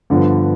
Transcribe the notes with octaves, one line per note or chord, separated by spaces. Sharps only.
G2 D3 F3 B3